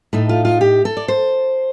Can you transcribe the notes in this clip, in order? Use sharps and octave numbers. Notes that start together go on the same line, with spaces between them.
A2 A3 D#4 A4
F4
F4
G4
A4
D5
C5